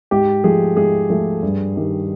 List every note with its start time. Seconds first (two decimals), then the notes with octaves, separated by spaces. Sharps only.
0.11 G#2 G4
0.44 F3 A3 G#4
0.77 G#2 G#4
1.10 F3 A3
1.43 G2
1.76 D#3 G3